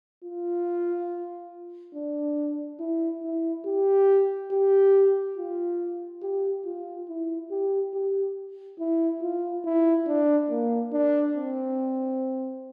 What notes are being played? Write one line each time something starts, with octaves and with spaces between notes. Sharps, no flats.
F4
D4
E4
E4
G4
G4
F4
G4
F4
E4
G4
G4
E4
F4
E4
D4
A#3
D4
C4